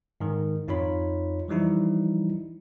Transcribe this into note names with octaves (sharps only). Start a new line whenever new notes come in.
G#2 D#3
F2 D#4 F4 C#5 B5
E3 F3 G3 D#4 E4